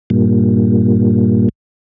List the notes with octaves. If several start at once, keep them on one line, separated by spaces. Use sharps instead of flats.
G2 A#2